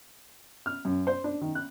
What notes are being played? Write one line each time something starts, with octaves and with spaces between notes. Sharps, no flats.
F6
F#2
C5
D4
D#3
F#6